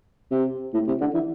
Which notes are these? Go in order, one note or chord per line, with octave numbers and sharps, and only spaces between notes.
C3
A2
C3
D3
E3